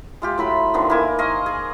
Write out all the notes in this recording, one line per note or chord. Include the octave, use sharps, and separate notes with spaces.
G#3 F4 G4
A2 F#3 B5 C6
D3 D#3 F3 B3
A#3 E4 G#5
D#5 F5 C6 C#6
G#4